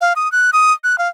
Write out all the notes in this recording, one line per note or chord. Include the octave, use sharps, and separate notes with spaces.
F5
D#6
F#6
D#6
F#6
F5